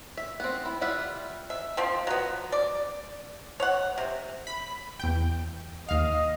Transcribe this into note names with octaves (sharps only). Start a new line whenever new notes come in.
E5
B3 C4
E4
G3 E4 F4 E5 F#5
E5
F3 C4
F#3 B3
D5
C#5 F#5
C3
B5
E2 G5
D#2 D#5 F5